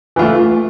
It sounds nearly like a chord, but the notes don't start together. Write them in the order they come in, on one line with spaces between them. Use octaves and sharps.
E3 F4 A3